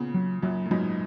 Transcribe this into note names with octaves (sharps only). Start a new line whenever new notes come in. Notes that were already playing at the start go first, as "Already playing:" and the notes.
Already playing: A#2 C#3 B3
F#3
F#2 A#2 F#3
A#2
G#2 B2 F#3